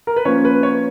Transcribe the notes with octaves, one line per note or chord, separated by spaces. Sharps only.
A#4
B4
F3 A#3 C#4 F4 C#5
B4
C#5